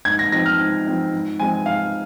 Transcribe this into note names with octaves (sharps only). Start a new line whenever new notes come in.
G#2 G#6
A#6
F3 C4 D#4 A#6
F6
G#2
F3 C4 D#4
G#2
F3 G#3 C4 G#5
G#2 F5